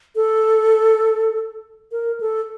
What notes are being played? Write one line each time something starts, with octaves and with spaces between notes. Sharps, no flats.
A4
A#4
A4